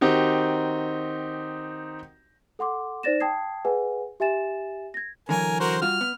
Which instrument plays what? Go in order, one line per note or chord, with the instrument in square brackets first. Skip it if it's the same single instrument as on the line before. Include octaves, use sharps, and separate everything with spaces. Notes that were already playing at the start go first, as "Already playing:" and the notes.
[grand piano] D#3 C4 D#4 F#4 G4
[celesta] A4 F#5 C6 D6
D#4 C5 D5 A6 A#6 E7
G5 A5 D#6 G#6 C7
G#4 B4 D#5 F#5 G#5
G4 E5 G#5 A6 E7
G#6 A#6
[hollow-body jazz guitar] D3 E3 F#3 [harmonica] A#4 G#5
[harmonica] F#4 A#4 C5
[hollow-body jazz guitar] G3 F4 F#4 [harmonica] F6
[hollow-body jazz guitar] B3